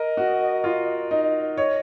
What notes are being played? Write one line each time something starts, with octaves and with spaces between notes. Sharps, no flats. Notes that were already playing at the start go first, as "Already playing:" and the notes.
Already playing: A#4 D#5
F#4
F4
D#4
C#5 D#5